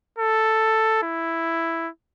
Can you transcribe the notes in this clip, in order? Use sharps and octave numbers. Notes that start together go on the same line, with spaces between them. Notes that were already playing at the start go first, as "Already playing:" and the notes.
A4
E4